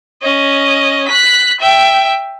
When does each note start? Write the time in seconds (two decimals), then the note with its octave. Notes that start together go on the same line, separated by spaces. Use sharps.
0.22 C#4 D#5
1.08 F#6 B6
1.61 E5 G5